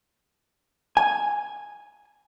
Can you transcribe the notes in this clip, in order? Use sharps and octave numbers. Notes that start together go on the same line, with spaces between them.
G#5